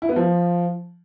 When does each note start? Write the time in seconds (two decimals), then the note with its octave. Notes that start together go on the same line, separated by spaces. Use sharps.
0.02 E4
0.09 B3
0.16 F3